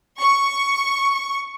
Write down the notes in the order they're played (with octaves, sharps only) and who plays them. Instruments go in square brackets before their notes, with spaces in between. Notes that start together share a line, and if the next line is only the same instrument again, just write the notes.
[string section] C#6